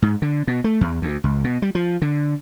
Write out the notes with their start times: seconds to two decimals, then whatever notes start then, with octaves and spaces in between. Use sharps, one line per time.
0.02 G#2
0.22 D3
0.47 B2
0.64 A3
0.81 E2
1.02 D2
1.24 C#2
1.44 B2
1.62 G3
1.75 F3
2.02 D3